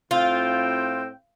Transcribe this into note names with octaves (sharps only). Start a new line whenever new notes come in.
A2 C4 F4 G5